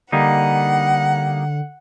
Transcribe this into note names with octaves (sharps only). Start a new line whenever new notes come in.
D3 G3 A#3 D#4 F#5